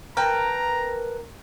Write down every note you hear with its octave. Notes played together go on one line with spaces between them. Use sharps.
A#4 B4 G5 A5 A#5